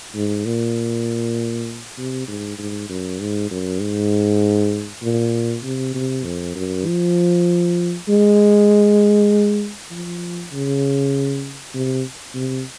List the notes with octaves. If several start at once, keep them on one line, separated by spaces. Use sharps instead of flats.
G#2
A#2
C3
G#2
G#2
F#2
G#2
F#2
G#2
A#2
C3
C3
F2
F#2
F3
G#3
F3
C#3
C3
C3